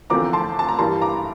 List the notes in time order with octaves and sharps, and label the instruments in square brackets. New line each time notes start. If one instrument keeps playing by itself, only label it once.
[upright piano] E2 D3 F3 C4 A#5 D6
A5 C6
A5
A#5
G2 E3 G3 A#3 A5 C6
A#5 D6